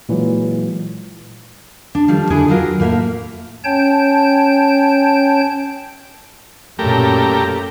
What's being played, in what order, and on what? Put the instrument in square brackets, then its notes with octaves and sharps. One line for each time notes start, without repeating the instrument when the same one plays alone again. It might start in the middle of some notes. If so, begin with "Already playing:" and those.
[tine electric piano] A#2 E3 F#3 G#3
[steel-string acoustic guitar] D4
D#3 F3 G3 A3
D3 D4 E4 G#4 A4
D#3 F#3 F4 A#4
A2 A#3 B4 E5 F5
[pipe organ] C#4 C#5 G5 A5 G6
[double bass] F#2 A#2 [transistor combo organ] A3 G4 A#4